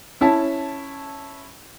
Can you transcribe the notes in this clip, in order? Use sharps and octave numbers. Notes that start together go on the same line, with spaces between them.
C#4 E4 C#5 A5